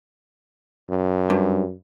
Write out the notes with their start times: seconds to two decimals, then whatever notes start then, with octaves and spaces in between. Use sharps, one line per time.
0.90 F#2
1.30 G2